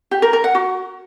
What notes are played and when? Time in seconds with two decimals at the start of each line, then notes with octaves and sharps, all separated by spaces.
0.11 G4
0.22 A#4
0.33 A#4
0.44 F#5
0.55 F#4